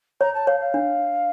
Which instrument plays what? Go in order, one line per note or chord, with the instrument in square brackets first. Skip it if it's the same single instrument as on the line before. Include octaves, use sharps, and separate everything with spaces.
[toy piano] C#5 [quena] A#5
[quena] A5
[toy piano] C#5 [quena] F5
[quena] F5
[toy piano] D4